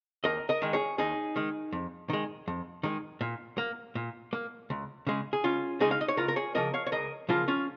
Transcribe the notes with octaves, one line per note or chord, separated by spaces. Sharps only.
D#2 A#4 D#5
A#4 D#5
D#3 G#3
G#4 C#5
D#2 D#4 G#4
D#3 G#3
F2
D#3 G#3
F2
D#3 G#3
A#2
A#3
A#2
A#3
C#2
C#3 G#3
G#4
C#2 C#4 F4
C#3 G#3 D#4 G#4
F5
D#5
C#5
C#2 F4 A#4
A#4
G#4 C#5
C#3 F3 A#3 A#4 D#5
C#5 F5
C#5
C#2 A#4 D#5
C#3 F3 A#3 F4 A#4
C#4 F4